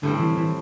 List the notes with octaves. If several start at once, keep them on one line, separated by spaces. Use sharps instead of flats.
A2 D3 G3 C4
E3
E3